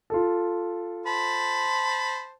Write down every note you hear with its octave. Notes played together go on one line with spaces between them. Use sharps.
F4 A4
C5 A5 B5